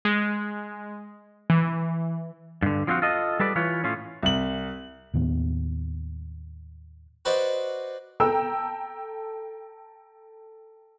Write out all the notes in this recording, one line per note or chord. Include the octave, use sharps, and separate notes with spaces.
G#3
E3
G2 D3
F3 F#3 C4 F4 F#4
F4 A4 D#5
G3 A4 B4 D5
E3 F4 B4 C#5
A2 C#4 F4
C2 F#7
D#2 A2 D#3 B3
F#4 B4 C5 D5 D#5
A4 G5 A#5 E6